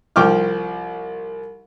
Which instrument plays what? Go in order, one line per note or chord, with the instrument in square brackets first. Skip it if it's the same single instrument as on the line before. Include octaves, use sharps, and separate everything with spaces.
[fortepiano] C2 F3 G5 C#6 D6 F6